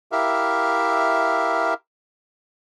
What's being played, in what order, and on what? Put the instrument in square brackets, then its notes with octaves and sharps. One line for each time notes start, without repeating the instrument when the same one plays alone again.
[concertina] E4 G4 A#4 E5 F5